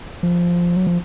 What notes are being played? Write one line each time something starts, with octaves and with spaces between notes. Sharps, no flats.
F3
F#3
F3